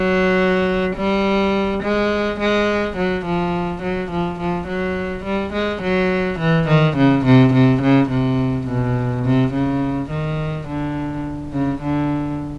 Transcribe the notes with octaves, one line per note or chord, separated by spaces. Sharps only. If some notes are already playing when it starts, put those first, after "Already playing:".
Already playing: F#3
G3
G#3
G#3
F#3
F3
F#3
F3
F3
F#3
G3
G#3
F#3
E3
D#3
C#3
C3
C3
C#3
C3
B2
C3
C#3
D#3
D3
C#3
D3